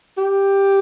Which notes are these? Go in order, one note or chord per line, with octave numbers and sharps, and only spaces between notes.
G4